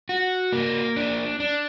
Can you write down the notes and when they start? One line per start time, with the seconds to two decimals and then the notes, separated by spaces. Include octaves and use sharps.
0.09 F#4
0.53 A#3
0.96 D4
1.40 D4